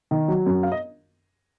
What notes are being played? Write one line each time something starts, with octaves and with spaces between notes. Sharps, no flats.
D#3
F#3
F#2
F5
D#5